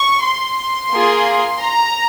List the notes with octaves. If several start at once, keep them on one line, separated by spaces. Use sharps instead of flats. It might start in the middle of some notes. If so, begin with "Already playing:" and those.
Already playing: C#6
C6
A#3 F4 G#4
A#5